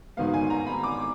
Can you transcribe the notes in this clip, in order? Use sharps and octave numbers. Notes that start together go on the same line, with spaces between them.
G#2 D#3 F#3 B3 F5
G#5
A#5
B5
D6